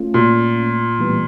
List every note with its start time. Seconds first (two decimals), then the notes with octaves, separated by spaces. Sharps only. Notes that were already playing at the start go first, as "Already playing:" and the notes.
Already playing: A3 C#4 F4
0.14 A#2
0.99 A2 E3 G3 B3